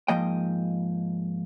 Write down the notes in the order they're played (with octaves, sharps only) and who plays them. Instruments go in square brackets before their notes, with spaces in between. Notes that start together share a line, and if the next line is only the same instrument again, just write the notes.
[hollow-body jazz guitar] G#2 F3 A#3 D#5 G5